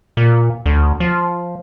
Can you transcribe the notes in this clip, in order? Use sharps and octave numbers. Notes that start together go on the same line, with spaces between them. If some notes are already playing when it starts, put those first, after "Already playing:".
A#2
D2
F3